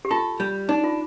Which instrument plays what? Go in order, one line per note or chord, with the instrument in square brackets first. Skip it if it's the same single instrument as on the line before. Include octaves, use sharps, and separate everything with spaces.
[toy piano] G4
[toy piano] F4 [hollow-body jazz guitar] A4
[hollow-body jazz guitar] G3
[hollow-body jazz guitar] D4 [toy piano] D#4
[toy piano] F4